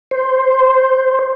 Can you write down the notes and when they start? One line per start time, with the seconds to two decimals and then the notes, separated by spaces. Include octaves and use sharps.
0.11 C5